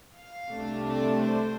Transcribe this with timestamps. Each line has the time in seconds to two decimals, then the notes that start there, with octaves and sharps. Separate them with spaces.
0.14 F5
0.50 C2 C3 A3 D4
0.86 D5
1.21 C5